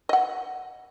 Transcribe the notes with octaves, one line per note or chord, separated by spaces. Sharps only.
D#5 F#5